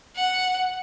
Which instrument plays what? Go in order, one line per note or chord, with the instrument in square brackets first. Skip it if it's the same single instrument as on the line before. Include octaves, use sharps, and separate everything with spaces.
[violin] F#5